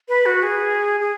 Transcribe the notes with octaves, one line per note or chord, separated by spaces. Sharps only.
B4
F#4
G#4
G#4